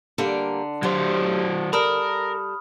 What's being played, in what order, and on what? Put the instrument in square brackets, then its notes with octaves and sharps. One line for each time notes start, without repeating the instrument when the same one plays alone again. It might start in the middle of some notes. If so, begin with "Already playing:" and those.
[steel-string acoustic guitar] D3 [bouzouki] G3 A#3 A#4
[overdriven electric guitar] F#3 C5 [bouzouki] G3 A3
[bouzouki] G3 A4 [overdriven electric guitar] A#4 [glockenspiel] B5 D#6 F6